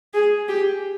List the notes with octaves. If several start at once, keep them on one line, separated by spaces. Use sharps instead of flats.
G#4
G4